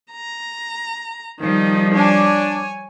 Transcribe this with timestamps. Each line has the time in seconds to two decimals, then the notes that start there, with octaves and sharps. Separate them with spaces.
0.12 A#5
1.40 D#3 F3 G3 D#4
1.95 D4 C#5 G#5